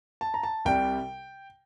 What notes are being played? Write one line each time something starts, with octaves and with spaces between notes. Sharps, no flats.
A5
A#5
A5
C2 C3 G3 G5